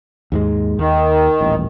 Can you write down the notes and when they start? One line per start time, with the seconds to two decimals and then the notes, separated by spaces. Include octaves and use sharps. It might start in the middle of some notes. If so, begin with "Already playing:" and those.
0.32 D#2 G#2 G#3
0.79 D#2 D#3
1.41 D#1 A1